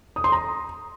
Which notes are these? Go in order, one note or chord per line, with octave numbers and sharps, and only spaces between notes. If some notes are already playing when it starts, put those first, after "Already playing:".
D#6
C6
A#5